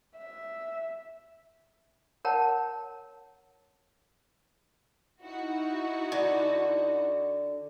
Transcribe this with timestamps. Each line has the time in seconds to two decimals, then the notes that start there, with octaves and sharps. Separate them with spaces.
0.17 E5
2.25 A#4 C#5 F#5 A5 A#5
5.23 D#4 E4 F#4
6.12 D3